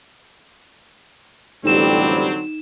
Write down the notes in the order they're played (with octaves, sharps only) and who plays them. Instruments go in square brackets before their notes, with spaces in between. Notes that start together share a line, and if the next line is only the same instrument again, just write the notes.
[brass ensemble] A1 F2 G3 [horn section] D3 F#3 C4 [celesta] D#4 E7